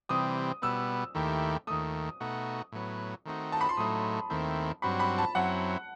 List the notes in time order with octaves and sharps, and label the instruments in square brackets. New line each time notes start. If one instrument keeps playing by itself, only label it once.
[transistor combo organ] C3 E3 G3 C4 [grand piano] D#6
[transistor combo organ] B2 G3 B3 [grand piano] E6
[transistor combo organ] D#2 D#3 A3 E4 G4
[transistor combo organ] D#2 D#3 A3 [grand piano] D#6
[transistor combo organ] B2 A3 D#4 F#4
A2 F#3 B3
D#3 A3 C4 D#4 F#4
[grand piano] A5
B5
C6
[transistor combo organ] A2 F#3 A3 D#4 [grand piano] D#6
[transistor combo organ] D#2 D#3 A3 C4 E4
[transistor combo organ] G2 F#3 C4 F#4 [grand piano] B5
[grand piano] B5
A5
[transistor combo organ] F#2 F#3 C4 E4 [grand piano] F#5